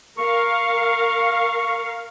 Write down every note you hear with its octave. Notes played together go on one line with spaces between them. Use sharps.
A#4 F5 C#6